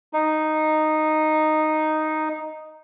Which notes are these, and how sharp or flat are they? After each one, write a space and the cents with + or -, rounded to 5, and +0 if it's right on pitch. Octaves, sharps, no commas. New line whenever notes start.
D#4 -5